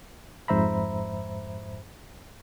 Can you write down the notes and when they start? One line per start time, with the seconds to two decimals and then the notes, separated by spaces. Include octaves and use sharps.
0.48 F2 G#2 C5 E5 A#5 B5